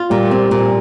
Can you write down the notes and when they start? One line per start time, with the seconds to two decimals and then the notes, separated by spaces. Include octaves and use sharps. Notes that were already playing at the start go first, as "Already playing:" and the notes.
Already playing: F4
0.10 A#2 G3
0.31 C4
0.51 A#2